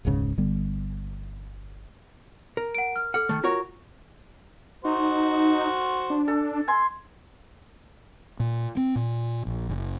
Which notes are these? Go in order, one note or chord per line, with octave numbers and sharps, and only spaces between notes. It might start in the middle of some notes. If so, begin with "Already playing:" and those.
E1 C#2 G#2 C#3
G1 D3 G3 B3
A#4
F#5 D7
F6
A4 F#5 F6
D#3 A3
F4 F#4 A#4 C#5
D#4 F#4 C5
D4
A4
G#5 C6
A#2
C4
A#2
A#1
F#1